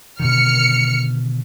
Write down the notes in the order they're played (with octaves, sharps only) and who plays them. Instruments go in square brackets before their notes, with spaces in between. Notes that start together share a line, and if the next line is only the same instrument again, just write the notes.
[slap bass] B2 D3 D#3 [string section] F6 C#7